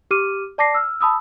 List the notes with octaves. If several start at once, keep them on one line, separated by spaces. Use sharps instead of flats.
G4 D6 F6 D#7
D5 A5 D6 A#6 C7
E6 F6
A5 B5 D#6 E6